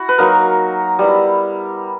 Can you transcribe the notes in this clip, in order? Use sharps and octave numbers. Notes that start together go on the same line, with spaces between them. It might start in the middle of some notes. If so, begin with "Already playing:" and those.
Already playing: E4 F#4
B4
F#3 A#3 D#4 A#4
G3 B3 E4